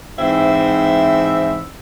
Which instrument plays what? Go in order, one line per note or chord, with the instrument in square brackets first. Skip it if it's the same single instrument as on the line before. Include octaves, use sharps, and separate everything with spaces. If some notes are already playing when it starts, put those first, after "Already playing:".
[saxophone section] G#2 E3 C4 E5